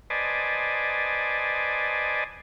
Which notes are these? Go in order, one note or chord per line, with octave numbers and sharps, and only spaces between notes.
B4 C5 D5 D#5 G#5 A5